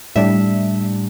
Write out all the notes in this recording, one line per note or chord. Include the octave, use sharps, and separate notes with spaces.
A2 G3 D4 E5